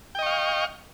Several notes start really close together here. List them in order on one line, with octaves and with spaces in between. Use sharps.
G5 D#5 C#6 F5